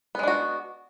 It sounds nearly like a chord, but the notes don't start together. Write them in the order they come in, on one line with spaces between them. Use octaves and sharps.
B3 G#3 D4 F#4